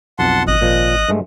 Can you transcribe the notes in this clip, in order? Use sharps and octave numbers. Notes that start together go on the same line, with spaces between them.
B1 F2 F#5 A5 C6
G#1 D#5 D#6 F#6
A#2 F3
G2 G#3 A3